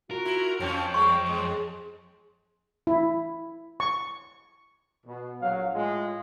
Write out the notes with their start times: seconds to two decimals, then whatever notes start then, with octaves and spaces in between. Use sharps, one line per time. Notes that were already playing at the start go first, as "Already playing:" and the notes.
0.11 F4 F#4 A#4
0.25 E4
0.60 F2 F3 C#4 C#5 G5
0.94 G3 G#3 C#6
1.26 G#3
2.87 E4
3.80 C#6
5.06 B2
5.41 A#1 F#3 F5
5.73 A2 G#3 F4